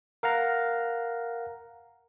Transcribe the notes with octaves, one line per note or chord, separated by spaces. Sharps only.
A#4 F5 F#5 A#5